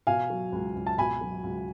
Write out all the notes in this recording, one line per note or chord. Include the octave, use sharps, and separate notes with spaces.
B2 F5 G#5
F#3
C#2
C#2
A5
B2 G#5 B5
F#3
C#2